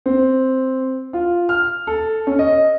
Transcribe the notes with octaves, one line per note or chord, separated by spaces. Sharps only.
C4
F4
F6
A4
C#4
D#5